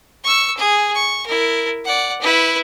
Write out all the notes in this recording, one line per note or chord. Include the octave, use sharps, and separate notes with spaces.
C#6 E6
G#4
C#6
E4 A#4
D5 F#5
E4 B4